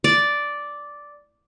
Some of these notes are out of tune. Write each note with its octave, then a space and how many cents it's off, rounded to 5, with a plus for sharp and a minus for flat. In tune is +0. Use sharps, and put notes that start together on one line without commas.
D5 -5